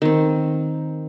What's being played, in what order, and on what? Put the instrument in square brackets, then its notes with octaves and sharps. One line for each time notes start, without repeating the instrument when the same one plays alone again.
[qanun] D#3 C4